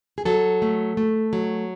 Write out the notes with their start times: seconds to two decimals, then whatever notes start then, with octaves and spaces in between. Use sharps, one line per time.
0.18 G#4
0.25 F#3 A4
0.62 A3
0.97 A3
1.33 F#3